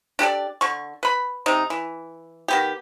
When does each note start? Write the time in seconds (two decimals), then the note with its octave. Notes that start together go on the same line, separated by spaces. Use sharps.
0.19 D4 G4 A4 D5
0.61 D3 C#6
1.03 B4 B5
1.46 C3 D#4
1.70 E3
2.48 D#3 B3 G4